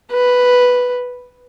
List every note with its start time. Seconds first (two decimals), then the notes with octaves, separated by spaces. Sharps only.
0.12 B4